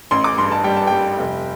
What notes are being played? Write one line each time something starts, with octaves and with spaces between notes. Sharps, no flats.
A1 C6
D6
G2 C6
A5
G3 G5
A5
G3 G5
F1